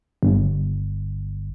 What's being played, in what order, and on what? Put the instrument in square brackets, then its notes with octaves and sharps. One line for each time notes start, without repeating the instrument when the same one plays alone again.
[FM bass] G1